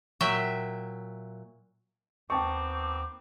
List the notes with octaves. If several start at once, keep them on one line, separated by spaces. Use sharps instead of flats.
A#2 F#3 E5 G5
D#2 D#3 B3 C4 G5 A5 C#6 D6